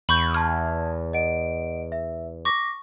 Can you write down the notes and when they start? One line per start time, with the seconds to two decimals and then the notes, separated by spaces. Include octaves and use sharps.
0.09 E2 B5 C#6 G6
0.34 A5 F6 G#6
1.13 D#5 F#5 D7
1.92 E5
2.45 C#6 D6 A#6 B6